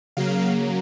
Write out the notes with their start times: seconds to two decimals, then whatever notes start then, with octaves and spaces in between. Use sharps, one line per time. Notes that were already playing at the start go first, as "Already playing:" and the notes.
0.17 C#3 F#3 A#3 F5